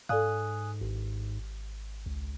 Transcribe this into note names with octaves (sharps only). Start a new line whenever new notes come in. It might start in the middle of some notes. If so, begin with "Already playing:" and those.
G#2 A4 D5 F5 G#5 D#6 F#6
G#1
C#2